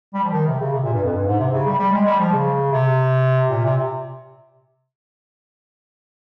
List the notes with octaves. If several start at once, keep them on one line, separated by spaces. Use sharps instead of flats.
G3
F3
D#3
C3
C#3
C3
A#2
G2
F2
G2
G#2
C3
C#3
G3
G3
G#3
G3
F3
C#3
C3
A#2
C3